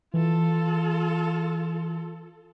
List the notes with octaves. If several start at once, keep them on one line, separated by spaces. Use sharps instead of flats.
E3 F4 A4